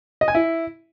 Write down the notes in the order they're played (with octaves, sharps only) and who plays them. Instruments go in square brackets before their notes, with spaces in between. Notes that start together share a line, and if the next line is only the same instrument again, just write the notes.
[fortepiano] D#5
G#5
E4